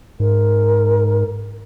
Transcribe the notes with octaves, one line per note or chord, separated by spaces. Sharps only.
G#2 A#4